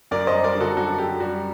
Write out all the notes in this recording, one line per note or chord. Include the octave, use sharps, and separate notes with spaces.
F#2 A#4 D5
C5 D#5
G3
A#4 D5
D3
F#4 A4
F#2 F#4 A4
F#2 G4
G3 F#4